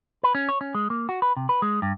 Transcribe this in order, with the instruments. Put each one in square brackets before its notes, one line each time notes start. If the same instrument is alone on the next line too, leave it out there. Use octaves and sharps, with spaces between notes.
[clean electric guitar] B4
C#4
C#5
C#4
G#3
A#3
F#4
B4
C3
B4
G#3
G2